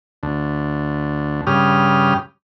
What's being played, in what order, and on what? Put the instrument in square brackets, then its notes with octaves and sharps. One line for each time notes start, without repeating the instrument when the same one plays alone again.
[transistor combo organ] D2
G2 C#3 G4 D#6 F6